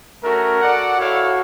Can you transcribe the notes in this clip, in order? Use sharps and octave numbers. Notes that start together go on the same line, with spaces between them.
A3 C#4 F#4 A#4
F#4 A4 D5 F#5
E4 F#4 A4 C#5 F5